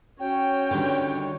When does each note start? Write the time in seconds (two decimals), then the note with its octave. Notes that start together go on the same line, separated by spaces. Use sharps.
0.20 C#4 F#4 C#5 G5
0.71 D3 D#3 G3